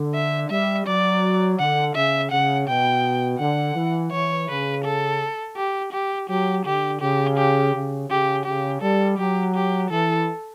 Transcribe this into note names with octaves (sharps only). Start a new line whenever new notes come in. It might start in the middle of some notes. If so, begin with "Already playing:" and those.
Already playing: D3
E5
G3 E5
F#3 D5
D3 F#5
C#3 E5
C#3 F#5
B2 G5
D3 F#5
E3
E3 C#5
C#3 B4
A4
G4
G4
F#3 G4
D3 G4
C#3 G4
G4
C#3
C#3 G4
C#3 G4
G3 A4
F#3 G4
G4
E3 A4